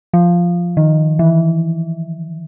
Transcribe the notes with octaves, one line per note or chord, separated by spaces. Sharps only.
F3
D#3
E3